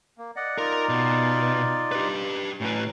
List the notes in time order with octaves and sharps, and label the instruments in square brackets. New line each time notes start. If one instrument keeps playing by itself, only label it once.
[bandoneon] A#3
D5 D#5 F#5
[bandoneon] D#4 F4 D5 [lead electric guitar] A#4 A#5
[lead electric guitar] B2
G4 B4
[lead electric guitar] A2 B4 [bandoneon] F#3 C#4